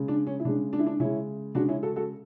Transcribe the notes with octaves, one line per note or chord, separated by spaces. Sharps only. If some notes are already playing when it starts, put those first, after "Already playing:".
Already playing: C#3 G#3
D4
C#4
E4
C#3 G#3 D4
D4
E4
D4
C#3 G#3 C#4 E4
C#3 G#3 D4 F#4
C#4 E4
F#4 A4
F#4 A4